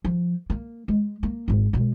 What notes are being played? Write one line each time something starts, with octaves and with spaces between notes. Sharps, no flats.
F3
A#3
G#3
A#3
G#1 G#2
B2 G#3